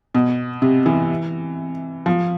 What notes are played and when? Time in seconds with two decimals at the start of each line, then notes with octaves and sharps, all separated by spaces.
0.15 B2
0.62 C3
0.86 E3
2.06 F3